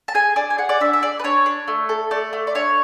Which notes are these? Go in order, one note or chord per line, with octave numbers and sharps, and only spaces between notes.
A5
G#4 G#5
D4
G#5
G#4 F#5
D5
D4 E5
E5
G#4 D5
B4
D4 C#5
D4
A3
A4
A3 D5
A3
D5
D4 C#5